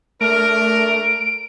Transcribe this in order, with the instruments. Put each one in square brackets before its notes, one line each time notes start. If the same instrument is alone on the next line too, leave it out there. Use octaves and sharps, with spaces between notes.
[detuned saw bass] A3 [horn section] D4 A#4 [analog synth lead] D7